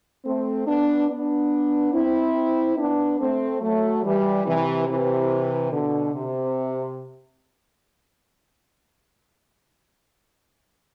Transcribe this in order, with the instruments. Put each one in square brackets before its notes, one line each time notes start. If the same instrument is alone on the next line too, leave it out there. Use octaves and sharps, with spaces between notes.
[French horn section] A3 C4
B3 D4
B3 D4
C4 E4
B3 D4
A3 C4
F#3 A3
E3 G3
C3 E3
C3 E3
B2 D3
C3